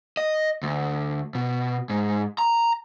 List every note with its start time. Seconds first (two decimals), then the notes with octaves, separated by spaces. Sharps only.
0.17 D#5
0.63 D2
1.35 B2
1.90 G#2
2.38 A#5